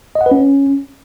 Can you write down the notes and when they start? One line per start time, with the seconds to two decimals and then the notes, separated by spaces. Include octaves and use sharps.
0.15 D#5
0.21 F#5
0.26 B4
0.31 C#4